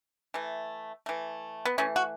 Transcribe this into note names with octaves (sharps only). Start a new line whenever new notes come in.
E3 A3
E3 A3
B3
E3 A3 C#4
F#4